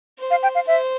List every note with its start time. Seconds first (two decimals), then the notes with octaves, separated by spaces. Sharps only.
0.18 C5
0.31 F5
0.43 G5
0.55 F5
0.67 C5 E5